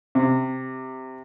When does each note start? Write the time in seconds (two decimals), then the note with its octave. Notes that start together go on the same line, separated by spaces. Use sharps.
0.15 C3